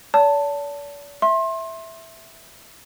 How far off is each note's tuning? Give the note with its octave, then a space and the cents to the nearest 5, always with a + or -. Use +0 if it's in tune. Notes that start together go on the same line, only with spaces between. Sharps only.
D5 -45 A5 +10
E5 -5 C6 +30